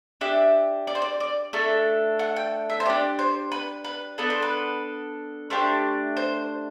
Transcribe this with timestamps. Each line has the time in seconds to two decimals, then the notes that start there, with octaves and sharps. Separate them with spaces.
0.21 D4 G4 E5
0.87 D5
0.95 C5
1.02 D5
1.20 D5
1.53 A3 D4 A4 E5
2.19 F#5
2.36 G5
2.70 E5
2.80 C5
2.85 D4 G4 D5
3.19 C5
3.52 B4
3.84 B4
4.18 B3 D4 A4 B4
4.30 C5
4.42 B4
5.50 A3 D4 G4 C5
6.17 C5